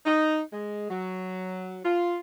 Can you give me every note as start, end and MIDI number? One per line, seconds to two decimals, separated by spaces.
0.06 0.41 63
0.53 0.89 56
0.90 1.78 54
1.84 2.17 65